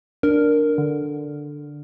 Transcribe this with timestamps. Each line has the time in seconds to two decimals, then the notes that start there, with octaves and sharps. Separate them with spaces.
0.23 D4 A#4
0.78 D3